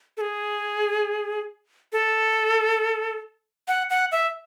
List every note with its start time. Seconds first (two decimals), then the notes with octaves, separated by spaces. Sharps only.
0.17 A4
0.21 G#4
1.93 A4
3.68 F#5
3.90 F#5
4.12 E5